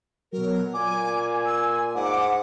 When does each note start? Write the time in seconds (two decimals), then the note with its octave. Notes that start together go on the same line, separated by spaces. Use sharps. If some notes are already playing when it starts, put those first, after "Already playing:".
0.33 B2 F#3 A#4
0.74 A#2 G#5 D6
1.45 E6
1.96 G#2 F#5 D6